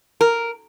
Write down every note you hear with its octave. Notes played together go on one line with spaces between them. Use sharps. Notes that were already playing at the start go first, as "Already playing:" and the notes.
A#4